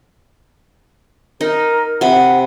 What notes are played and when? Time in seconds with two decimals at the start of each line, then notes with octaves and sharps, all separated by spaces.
1.41 D#4 A#4
2.01 C3 F#5 B5